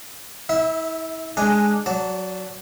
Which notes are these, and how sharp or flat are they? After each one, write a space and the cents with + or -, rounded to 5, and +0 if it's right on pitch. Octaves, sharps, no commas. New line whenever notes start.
E4 -35 E5 -5
G#3 +0 D4 +0 G#5 -15
F#3 +0 D5 -30 A5 +0